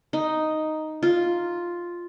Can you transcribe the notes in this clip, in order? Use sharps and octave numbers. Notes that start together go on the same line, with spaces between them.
D#4
F4